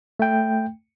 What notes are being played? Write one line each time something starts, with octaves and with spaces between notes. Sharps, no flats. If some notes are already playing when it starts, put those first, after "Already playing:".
A3 G5